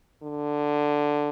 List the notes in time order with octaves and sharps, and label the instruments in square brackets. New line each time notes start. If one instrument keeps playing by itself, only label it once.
[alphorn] D3